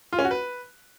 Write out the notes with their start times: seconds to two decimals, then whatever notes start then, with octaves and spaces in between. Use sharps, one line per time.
0.13 F4
0.19 C#4
0.25 F#4
0.31 B4